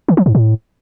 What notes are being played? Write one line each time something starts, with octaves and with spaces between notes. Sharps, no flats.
D#3
F3
G#2
A2